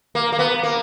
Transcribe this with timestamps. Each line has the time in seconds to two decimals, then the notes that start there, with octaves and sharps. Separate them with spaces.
0.15 A#3
0.32 A#3
0.39 B3
0.63 A#3